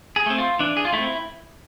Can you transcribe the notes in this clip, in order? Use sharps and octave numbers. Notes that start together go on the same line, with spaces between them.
G#4
A3 C4
F4
E3 D4
G#4
F4
A3 C4 E4